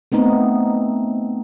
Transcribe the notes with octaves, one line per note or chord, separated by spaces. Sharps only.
A3 B3 C4 D#4